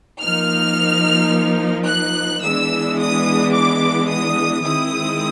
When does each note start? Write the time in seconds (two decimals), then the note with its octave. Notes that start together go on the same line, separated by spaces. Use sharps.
0.22 F3 A#3 D#4 F6
1.88 F#6
2.44 E3 G#3 B3 D4 E6
2.99 D#6
3.55 D6
4.10 D#6
4.66 D#3 G#3 C4 E4 D#6